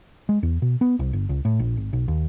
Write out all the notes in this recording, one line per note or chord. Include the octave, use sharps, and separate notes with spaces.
G#3
E2
B2
B3
C2
G1
C#2
A2
A#1
G#1
B1
D#2